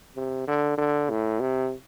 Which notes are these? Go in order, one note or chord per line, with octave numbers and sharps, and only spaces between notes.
C3
D3
D3
A2
C3